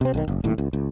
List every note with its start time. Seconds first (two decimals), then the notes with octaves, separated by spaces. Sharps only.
0.01 C3 C4
0.14 B1 D3 D#3
0.28 F#1
0.44 D#1 D#2 A2
0.58 C#2
0.73 C#2